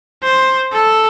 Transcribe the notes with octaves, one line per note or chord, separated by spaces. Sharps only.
C5
A4